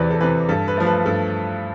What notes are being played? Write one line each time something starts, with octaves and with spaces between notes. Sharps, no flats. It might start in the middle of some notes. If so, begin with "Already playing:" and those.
Already playing: E2 C3 E3 B4 D5
A4
C3 E3 B4
G2 A4
B4
F3 A3
B4
G2 A4